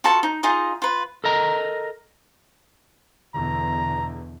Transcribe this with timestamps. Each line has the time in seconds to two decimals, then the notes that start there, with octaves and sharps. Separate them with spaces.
0.04 F4 F#4 A4 A5
0.23 D#4
0.43 D#4 F4 G#4 D#5
0.82 F4 B4
1.24 A4 A#4 D#5 A#5
3.35 E2 B2 D3 A#5